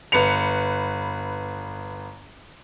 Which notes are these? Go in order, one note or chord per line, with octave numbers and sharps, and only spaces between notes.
G1 B4 C#7 F7